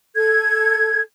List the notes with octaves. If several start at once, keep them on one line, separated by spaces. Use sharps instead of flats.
A4 G#6